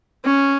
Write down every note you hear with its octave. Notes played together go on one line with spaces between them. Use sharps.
C#4